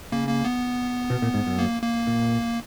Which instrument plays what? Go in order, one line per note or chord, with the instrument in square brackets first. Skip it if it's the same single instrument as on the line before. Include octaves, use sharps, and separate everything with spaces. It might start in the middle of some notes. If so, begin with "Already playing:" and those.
[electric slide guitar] C#3 [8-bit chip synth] A#3
[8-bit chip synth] A#3
B3
[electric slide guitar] B2
A#2
G#2
F#2
[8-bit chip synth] A#3
A#3
[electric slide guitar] A#2